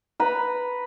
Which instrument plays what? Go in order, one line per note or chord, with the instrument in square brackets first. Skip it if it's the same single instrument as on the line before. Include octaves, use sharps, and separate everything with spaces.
[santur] B4 A#5 B5